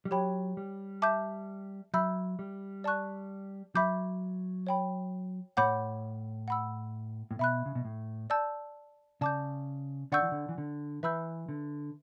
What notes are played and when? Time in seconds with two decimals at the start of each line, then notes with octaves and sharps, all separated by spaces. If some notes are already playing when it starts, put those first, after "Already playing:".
0.05 G3
0.11 F#3 G4 C#5 G5 B5
0.57 G3
1.02 E5 A5 D6 G6
1.94 F#3 E5 B5 E6 G6
2.39 G3
2.84 D5 A5 C#6 F#6
3.75 F#3 E5 B5 D6 G6
4.67 C#5 G5 B5
5.57 A2 C#5 F#5 B5 D6 G6
6.48 F#5 B5 E6
7.31 A2
7.39 B2 E5 B5 F#6
7.66 C#3
7.75 B2
7.85 A2
8.30 D5 A5 E6 G6
9.21 C#3 D5 A5 D6 G6
10.12 D3 D5 F#5 C#6 E6 G6
10.22 E3
10.32 D3
10.49 E3
10.58 D3
11.03 E3 B4 E5 B5 E6 G6
11.49 D3